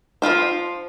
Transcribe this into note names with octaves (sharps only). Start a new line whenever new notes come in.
F3 G#3 F4 C5